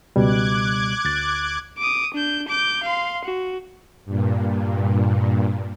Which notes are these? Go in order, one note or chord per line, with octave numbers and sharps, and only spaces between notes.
C#2 B2 G3 D6 F#6 G#6
D2 A6
D6 D#6
D4 G6
D6 G6
F5 C6
F#4
G2 A#2